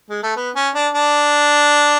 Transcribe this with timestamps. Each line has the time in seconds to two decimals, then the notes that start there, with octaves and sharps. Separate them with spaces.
0.10 G#3
0.23 A3
0.36 B3
0.56 C#4
0.75 D4
0.95 D4